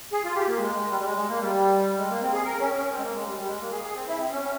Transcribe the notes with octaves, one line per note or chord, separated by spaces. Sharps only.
G#4
F4
G4
A#3
G#3
G#3
G3
G3
G#3
G#3
A#3
G3
G#3
A#3
C4
G#4
A#4
C#4
C#4
C4
G#3
A#3
G#3
G3
G3
G#3
A#3
G#4
G#4
C4
E4
C4
C#4